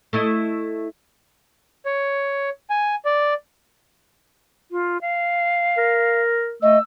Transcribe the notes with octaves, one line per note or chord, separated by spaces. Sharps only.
A3 E4 D#5
C#5
G#5
D5
F4
F5
A#4
A3 D#5 E6